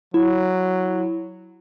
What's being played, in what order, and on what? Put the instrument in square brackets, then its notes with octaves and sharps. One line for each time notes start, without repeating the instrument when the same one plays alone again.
[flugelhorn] F#3 [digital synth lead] E4